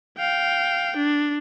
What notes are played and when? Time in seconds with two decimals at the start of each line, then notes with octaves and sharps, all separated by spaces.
0.18 F5 G5
0.97 D4